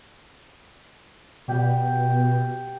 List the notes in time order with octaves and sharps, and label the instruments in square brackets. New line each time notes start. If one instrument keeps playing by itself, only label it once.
[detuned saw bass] B2 [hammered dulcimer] G4 F#5 G5